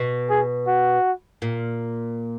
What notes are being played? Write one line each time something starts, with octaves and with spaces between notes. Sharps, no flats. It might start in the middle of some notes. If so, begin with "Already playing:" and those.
Already playing: B2
G#4
F#4
A#2